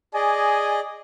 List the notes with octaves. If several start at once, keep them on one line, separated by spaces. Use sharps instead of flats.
G#4 D5 D#5 G#5